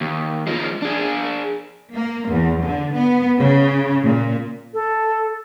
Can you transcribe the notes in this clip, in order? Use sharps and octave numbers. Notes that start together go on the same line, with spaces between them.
D#2
F3 G#3
D4 G#4
A#3
E2
D3
B3
C#3
A#2
A4